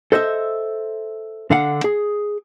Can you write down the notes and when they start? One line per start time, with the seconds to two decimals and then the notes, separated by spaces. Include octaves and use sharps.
0.12 A4 C5 D#5 E5
1.51 D3 F5 F#5
1.84 G#4